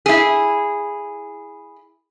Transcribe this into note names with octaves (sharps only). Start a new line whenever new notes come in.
E4 G#4